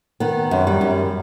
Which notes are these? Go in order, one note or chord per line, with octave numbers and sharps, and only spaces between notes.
D#3 B3
F#2
G3
F#2